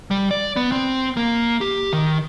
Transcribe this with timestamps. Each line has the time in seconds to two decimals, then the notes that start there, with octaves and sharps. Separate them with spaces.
0.11 G3
0.31 D5
0.57 B3
0.72 C4
1.17 A#3
1.61 G4
1.93 D#3